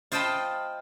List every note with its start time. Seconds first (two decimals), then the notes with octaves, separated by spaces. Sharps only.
0.12 F4 C5 D#5 G5 A5 B5